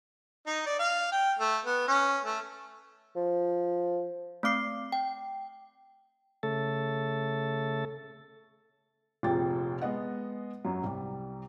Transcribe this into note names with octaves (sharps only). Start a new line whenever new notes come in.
D#4
D5
F5
G5
A3
B3
C#4
A3
F3
A3 C4 D6 C7
G5
C#3 A3 A4
F1 F2 A#2 G#4 G5 A6
G#3 B3 D#5 F#5
F#2 F#3
C2 G3